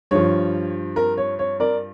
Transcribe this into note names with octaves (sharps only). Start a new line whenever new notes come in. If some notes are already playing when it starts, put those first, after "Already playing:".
G2 F3 C#5
A#4
C#5
C#5
A#4 D5